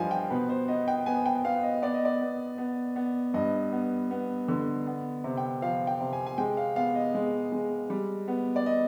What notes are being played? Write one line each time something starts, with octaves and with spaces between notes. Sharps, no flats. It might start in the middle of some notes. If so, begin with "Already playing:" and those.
Already playing: G2 F3 D#5 F5 G#5
G5
B2 B4
C5
B3 D#5
G5
B3 G#5
G5
B3 F5
D#5
B3 D5
D#5
D5
B3
B3
B3
G2 D#5
B3
B3
D3
B3
C3
G5
F3 F5
G5
C3
G#5
G#5
G#3 G5
F5
B3 F5
D#5
G#3
G#3
G3
B3
D5
D#5